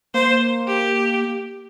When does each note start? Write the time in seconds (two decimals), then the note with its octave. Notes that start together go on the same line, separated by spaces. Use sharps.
0.14 A#3 C5
0.67 G4